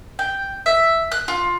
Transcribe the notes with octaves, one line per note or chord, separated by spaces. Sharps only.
G5
E5
F#6
F4